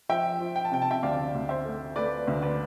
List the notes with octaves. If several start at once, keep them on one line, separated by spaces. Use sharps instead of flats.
F3 E5 G5
F3
G5
A5
C3 G5
A5
E5 G5
D2 D5 F5
D2
C5 E5
A3
A3 B4 D5
D2
B4 D5